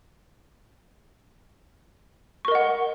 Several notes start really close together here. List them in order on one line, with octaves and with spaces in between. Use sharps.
C#6 A#4 D#5 F#5